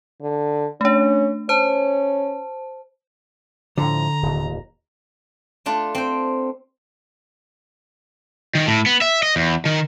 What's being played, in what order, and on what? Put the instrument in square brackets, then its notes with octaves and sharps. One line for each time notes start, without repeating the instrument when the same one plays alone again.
[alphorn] D3
[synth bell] A3 D4 [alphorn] C#4
[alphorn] C#4 [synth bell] C5 A5
[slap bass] A2 F3 [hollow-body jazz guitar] D3 [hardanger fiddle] A#5
[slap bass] D1 D#2
[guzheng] A3 D4 F4
C4 G5
[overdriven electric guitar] D#3
A2
B3
E5
D#5
E2
D#3